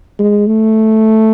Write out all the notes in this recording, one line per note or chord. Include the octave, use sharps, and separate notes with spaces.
G#3
A3